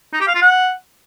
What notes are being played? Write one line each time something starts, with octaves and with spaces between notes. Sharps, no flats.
D#4
G4
F5
F4
F#5